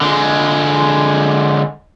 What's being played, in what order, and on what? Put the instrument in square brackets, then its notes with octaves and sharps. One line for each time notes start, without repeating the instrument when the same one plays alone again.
[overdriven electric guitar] D3 G#3